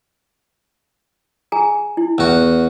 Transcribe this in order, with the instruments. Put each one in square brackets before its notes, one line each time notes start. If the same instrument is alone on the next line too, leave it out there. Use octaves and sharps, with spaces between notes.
[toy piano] G#4 G#5 A#5
E4
[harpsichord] E2 F#4